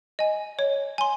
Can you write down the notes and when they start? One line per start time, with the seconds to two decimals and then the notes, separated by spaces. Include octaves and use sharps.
0.19 D#5 G#5
0.59 C#5
0.98 G#5 C6